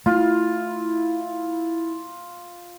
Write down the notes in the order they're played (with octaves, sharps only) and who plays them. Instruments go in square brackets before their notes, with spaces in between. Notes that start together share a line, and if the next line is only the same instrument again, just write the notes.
[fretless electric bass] A3 [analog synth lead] E4 [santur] F4